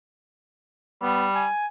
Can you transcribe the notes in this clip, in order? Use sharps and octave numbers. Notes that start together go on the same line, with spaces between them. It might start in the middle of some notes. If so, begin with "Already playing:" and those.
G3 B3
G#5